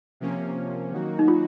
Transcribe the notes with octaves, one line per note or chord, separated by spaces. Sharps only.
C3 F3 A#3 C#4
D#3 F#3 A#3 D#4 F#4
D#4
F4